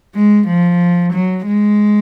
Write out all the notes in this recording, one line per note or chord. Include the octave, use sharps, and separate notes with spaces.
G#3
F3
F#3
G#3